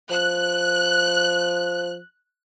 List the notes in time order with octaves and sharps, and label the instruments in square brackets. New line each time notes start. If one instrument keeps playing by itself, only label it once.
[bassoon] F3 [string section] F#6